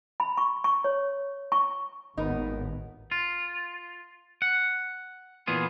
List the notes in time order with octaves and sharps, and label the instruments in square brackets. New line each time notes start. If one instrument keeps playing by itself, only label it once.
[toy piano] B5
C#6
C#6
C#5
C#6
[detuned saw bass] G#1 [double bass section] D#2 A2 B3 [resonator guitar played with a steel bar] D#4 A#4
[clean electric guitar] F4
F#5
A#2 E3 B3 F4 G#4